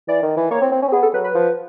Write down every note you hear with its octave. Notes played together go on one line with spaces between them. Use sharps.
E3 D5
D#3
E3
A#3 C#5
C4
C4
C#4
C4
B3 G#4
A4
F#3 B4
B4
F3